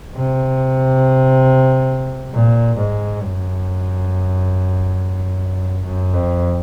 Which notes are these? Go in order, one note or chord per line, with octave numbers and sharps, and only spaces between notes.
C3
A#2
G#2
F#2
F#2
F2